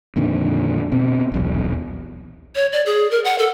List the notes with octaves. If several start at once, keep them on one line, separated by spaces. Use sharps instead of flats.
F2 A#2 D3 D#3
B2 C4
D#1 B1 E2
C#5
D5
G#4
A#4
F#5
A4